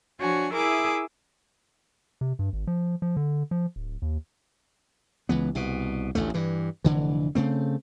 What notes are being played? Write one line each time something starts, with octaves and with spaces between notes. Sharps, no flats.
F3 D4 F#4 C#5 G#5
E4 G#4 A#4 E5 D6 D#6
C3
G2
G#1
F3
F3
D3
F3
D1
D#2
C#2 E3 B3
C2 B2
A1 D2 A3
G2 E3
F1 D3 E3
C#3 A3 C4